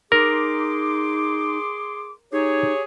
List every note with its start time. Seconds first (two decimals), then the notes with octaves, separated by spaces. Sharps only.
0.12 D#4 G#4 A#4 C6 D6
2.32 D#4 G4 G#4 C#5